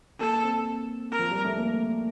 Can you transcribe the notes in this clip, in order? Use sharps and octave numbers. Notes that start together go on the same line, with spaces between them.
A#3 A4
C4
A#4
F3
G3
A3
A#3